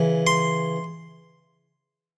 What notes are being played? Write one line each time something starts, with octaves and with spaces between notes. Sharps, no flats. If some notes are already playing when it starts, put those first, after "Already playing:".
Already playing: C#3 E3
C6